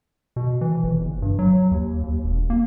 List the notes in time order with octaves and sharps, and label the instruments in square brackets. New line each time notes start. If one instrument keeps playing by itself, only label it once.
[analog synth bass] B2
E3
G1
F#1
G2
F#3
D#2
D#2
E1
A#3